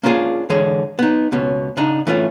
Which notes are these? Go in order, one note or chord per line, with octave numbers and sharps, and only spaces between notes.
A#3 C#4 D4 F4 G#4
D3 E3 G#3 G#4 C#5
B3 D#4
C#2 B2 C#4
C#3 D4 D#4
E3 A3 C#4 F4